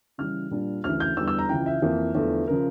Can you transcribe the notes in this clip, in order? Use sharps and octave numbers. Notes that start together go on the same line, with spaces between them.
C#3 E3 G3 F6
A#2 G3 D4
D2 C#3 E3 F6
G6
E2 D3 G3 E6
E6
A#5
C#2 C#3 E3 G5
E5
F2 E3 A#3
E2 D3 F3 A3
C#3 F3 A#4